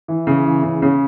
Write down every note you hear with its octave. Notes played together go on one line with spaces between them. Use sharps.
E3
C#3
E3
C#3
C#3